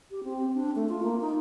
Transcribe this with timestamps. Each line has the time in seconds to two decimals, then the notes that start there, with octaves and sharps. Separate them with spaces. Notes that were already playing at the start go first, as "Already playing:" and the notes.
0.11 G4
0.24 C4
0.54 D4
0.75 A3
0.89 F4
1.03 A#3
1.21 D#4